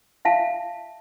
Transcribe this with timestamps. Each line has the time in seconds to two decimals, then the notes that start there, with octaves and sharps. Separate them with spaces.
0.25 E5 F5 A5